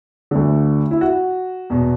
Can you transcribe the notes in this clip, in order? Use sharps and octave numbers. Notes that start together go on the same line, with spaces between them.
D2 D3
E4
F#4
E2 B2